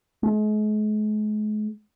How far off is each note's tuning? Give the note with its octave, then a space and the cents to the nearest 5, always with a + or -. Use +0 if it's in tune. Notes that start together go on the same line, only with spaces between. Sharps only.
G#3 +40